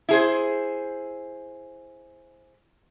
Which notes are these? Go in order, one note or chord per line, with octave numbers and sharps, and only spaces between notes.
E4 G#4 C5